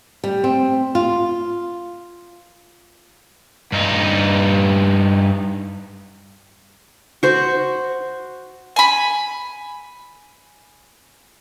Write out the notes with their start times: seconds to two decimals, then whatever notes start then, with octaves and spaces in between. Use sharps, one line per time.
0.24 G3
0.44 C4
0.95 F4
3.72 G2 D#4
7.23 F#4 C5
8.76 G#5 B5